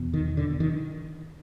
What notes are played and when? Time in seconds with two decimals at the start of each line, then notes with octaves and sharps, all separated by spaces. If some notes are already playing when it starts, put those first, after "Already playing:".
Already playing: E2 B2
0.14 D#3
0.37 D3
0.60 D#3